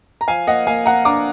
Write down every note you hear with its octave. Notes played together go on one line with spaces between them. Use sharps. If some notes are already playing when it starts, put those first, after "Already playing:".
A#5
F3 F5 G#5
A#3 D#5 F#5
A#3 F5 G#5
A#3 F#5 A#5
D4 A#5 D6